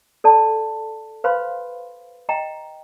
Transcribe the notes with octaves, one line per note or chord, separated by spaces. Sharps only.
A4 D5 A5
B4 C5 F5 B5 C6
D#5 G5 A#5